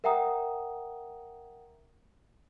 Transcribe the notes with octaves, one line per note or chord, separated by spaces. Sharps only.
A#4 E5 F#5 G5 A#5 D#6